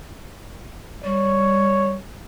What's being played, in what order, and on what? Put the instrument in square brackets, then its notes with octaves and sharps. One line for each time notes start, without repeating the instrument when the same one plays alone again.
[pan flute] G3 [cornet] C#5